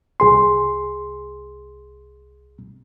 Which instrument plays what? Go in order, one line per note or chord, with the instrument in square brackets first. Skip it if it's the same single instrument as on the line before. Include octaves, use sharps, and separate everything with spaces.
[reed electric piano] C2 G#4 C6